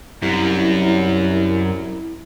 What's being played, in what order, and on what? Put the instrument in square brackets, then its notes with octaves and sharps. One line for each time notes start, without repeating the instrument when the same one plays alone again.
[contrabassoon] C2 [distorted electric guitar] F#2 [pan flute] E4